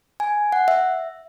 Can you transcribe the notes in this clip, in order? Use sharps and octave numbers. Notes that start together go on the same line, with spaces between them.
G#5
F#5
E5